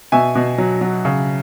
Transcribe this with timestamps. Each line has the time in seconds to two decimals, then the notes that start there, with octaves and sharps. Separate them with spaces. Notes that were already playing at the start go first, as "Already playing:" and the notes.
0.12 B2 E5 G#5
0.35 B2
0.58 F#3
0.81 F#3
1.05 C#3